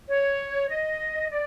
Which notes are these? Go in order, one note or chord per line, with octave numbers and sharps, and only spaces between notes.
C#5
D#5
D5